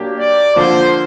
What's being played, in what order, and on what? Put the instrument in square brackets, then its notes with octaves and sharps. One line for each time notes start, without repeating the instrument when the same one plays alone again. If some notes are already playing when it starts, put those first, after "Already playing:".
Already playing: [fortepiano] F#3 A#3 D4 G4
[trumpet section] D5
[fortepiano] D3 F3 A#3 [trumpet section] C5